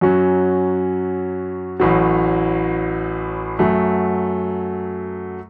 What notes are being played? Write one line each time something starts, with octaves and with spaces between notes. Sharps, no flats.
F#2 F#3 C#4 F#4
A1 A2 F#3
F#2 F#3 A3